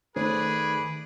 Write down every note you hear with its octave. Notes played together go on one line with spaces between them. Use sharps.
D#3 A3 G#4 B4 C5 D5 B5